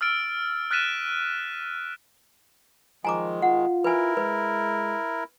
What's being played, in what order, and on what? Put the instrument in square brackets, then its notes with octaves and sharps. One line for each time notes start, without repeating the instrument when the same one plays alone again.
[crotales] E6 F6 A6 D7
F6 F#6 A6 B6 D#7 E7
[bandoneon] D#3 G#3 [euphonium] F3 [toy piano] G#5 A#5 D6
[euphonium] F4 [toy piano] F#5
[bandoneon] E4 A#4 [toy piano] B4 G#5
[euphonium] G#3 [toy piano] B4